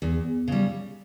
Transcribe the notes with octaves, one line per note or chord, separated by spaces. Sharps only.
E2
C#3 G3